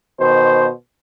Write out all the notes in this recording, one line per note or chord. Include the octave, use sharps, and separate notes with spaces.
B2 D#3 C5